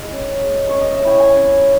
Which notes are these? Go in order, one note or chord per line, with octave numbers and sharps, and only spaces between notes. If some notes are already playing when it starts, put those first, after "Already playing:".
Already playing: G#3 E4
C#4
G#3
C#4 C#5
D#5
E5
E4 G5
G#5
C#4